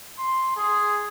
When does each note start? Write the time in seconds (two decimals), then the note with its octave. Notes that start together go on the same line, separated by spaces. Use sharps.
0.19 C6
0.57 G#4